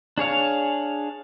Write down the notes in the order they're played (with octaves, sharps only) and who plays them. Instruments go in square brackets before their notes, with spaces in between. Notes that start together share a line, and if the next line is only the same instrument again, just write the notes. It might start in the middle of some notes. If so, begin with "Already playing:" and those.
[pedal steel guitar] D4 G#4 C#5 F5